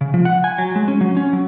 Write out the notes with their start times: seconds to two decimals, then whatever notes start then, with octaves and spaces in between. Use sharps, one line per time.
0.01 C#3
0.14 F3
0.25 F#5
0.44 G#5
0.58 F#3
0.76 G#3
0.88 C#4
1.01 F#3
1.17 C#4
1.33 F#3